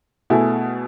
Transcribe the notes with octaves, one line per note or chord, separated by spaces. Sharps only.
B2 A3 E4 G#4